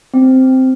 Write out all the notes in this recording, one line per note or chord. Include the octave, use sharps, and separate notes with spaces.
C4